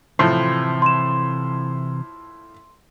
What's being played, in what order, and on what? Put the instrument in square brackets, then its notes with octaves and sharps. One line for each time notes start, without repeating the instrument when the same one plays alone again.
[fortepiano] A2 F3 [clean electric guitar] C3 E3 C5
[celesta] C6 E7